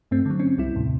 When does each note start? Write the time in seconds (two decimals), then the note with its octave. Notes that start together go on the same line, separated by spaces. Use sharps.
0.11 G2 A3 C4
0.26 D3 F#3
0.39 C4 C#4
0.57 C2 G3 E4
0.75 D#2 A2 C3